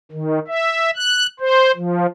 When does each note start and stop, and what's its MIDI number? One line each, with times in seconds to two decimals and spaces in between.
0.12 0.39 51
0.48 0.91 76
0.96 1.26 90
1.40 1.71 72
1.76 2.07 53